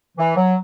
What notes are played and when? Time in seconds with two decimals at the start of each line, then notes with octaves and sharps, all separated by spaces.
0.18 E3
0.36 F#3